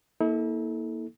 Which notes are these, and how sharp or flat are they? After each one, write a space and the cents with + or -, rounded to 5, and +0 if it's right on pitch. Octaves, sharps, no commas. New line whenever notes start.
A#3 +15 E4 -45 A4 -15